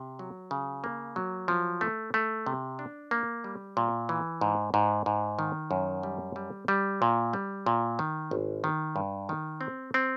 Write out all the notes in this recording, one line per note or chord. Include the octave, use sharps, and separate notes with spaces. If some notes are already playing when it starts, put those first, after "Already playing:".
Already playing: C3
F#3
C#3
A#3
F#3
F3
A3
A3
C3
D4
A#3
G3
A#2
E3
G#2
G#2
G#2
D#3
F#2
G3
G3
G3
A#2
G3
A#2
D#3
G#1
D#3
G2
D#3
C4
C4